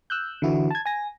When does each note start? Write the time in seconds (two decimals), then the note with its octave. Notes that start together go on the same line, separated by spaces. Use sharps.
0.10 E6 F#6 G6
0.42 D3 E3 E4 F#4
0.71 A5 G#6
0.86 G#5 A#6